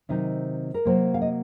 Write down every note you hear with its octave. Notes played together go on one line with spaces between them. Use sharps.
C3 D#3 F#3 C4 D#4
A#4
C3 F#3 A#3 C5
F5
D#5